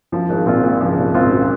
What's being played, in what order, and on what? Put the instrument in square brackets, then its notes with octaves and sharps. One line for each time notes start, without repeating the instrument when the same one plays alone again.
[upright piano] F#2 [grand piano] F3
[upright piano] G#1 G#2
[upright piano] A#1 A#2 [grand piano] C4 F4
[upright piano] A#1 A#2
[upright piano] C#2 C#3 [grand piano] F3
[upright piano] C2 C3
[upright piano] G#1 G#2 [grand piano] C4 F4
[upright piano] F#2